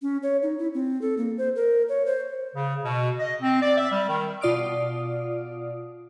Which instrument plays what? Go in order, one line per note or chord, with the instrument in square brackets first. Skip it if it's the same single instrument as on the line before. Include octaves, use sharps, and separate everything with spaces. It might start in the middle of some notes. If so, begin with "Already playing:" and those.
[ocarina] C#4
C#5
D#4
E4
C4
A4
A#3
C5
A#4
C#5
C5
[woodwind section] C#3
B2
D#5
C4
D5
E5
G3
D#3
[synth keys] B2 F4 D5 D#6 F6 D7